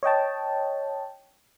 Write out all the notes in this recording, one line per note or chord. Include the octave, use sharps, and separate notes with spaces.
C#5 D#5 G5 A5